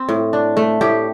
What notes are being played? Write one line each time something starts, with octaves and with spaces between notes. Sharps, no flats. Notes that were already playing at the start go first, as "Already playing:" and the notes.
Already playing: C4
A2
D4
A3
A2 G4